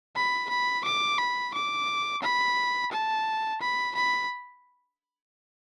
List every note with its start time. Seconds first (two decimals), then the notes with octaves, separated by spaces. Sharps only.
0.16 B5
0.49 B5
0.84 D6
1.19 B5
1.54 D6
2.23 B5
2.92 A5
3.61 B5
3.95 B5